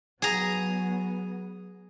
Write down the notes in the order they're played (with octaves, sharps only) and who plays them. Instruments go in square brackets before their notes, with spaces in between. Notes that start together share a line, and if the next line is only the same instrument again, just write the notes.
[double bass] F#3 B3 [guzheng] G#4 A#5